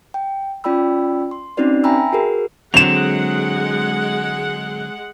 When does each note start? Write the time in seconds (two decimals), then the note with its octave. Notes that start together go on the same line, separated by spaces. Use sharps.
0.14 G5
0.64 C#4 F4 D5 G5 B5 E6
1.31 C6
1.57 C4 C#4 D#4 F#4 B4 D5
1.84 E5 G5 G#5 A#5 B5 E6
2.13 F#4 G#4 A#4 B4
2.74 D3 F#3 G#3 C4 F#5 E7 F7